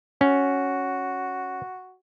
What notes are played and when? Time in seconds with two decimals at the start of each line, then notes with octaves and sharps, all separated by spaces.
0.21 C#4 F#4